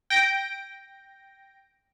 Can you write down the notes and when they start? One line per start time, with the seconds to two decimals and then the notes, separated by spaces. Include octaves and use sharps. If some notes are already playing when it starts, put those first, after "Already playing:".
0.10 G5 A#6 D7